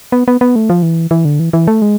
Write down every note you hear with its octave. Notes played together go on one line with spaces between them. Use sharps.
B3
B3
B3
A3
F3
E3
E3
D3
E3
E3
A3
G#3